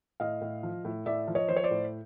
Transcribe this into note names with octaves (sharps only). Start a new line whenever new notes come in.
A2 D#5 F5
A2
F3
A2
A2 D5 E5
F3
C#5 D#5
F3 C5
C#5
C5 D5
A2